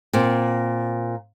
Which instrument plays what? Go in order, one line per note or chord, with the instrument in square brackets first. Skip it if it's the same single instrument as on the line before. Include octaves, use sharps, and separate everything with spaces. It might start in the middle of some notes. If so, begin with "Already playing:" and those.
[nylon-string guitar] A#2 C4